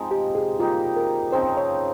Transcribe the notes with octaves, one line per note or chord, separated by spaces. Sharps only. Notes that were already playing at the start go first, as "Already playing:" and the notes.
Already playing: F3 G#3 C4 D#4
G4
G#4
G3 A#3 D#4 F4 G4
A#4
C#3 F3 C4 D#4 C5
C#5